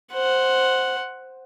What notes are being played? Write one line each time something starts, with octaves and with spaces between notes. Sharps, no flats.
C5 F#5